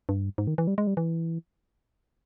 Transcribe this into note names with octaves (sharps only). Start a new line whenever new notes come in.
G2
G#2
D#3
E3
G3
G#3
G3
E3